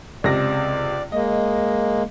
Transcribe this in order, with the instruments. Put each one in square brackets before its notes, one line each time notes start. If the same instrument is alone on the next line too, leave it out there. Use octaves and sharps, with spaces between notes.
[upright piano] C#2 C3 A#6 [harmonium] D5
[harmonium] G#3 A#3 [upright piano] D#5